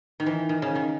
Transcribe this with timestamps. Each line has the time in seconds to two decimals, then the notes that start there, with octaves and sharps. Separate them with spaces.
0.20 D#3
0.26 E3
0.49 D#3
0.62 C#3
0.75 D#3